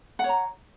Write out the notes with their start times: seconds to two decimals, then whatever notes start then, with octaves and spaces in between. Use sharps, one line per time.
0.19 F#5
0.24 C#5
0.29 A#5